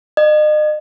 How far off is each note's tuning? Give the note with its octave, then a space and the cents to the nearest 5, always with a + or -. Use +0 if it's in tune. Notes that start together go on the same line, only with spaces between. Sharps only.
D#5 -40